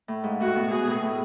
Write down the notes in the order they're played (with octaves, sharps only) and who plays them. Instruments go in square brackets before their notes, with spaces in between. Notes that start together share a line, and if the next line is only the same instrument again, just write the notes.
[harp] A2
G#2
[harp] A2 [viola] F#4
[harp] B2
[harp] B2 [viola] G#4
[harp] A2
A2